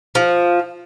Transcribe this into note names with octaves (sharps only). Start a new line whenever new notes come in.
F3